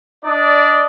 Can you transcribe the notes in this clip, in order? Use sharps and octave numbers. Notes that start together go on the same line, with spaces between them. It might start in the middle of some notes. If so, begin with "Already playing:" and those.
D4 D5 D#5